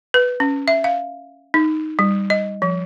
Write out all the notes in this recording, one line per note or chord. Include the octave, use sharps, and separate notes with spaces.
B4
C#4
E5
F5
D#4
G3
D#5
F3